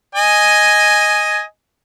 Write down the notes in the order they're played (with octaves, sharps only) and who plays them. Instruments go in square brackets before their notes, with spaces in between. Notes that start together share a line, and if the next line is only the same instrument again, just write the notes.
[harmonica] D#5 G#5